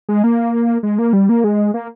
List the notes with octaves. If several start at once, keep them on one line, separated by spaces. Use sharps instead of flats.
G#3
A#3
G#3
A#3
G3
A#3
G#3
A#3